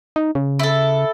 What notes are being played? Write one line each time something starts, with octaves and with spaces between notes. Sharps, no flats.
D#4
C#3
E4 A4